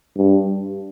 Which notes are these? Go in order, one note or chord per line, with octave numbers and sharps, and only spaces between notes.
G2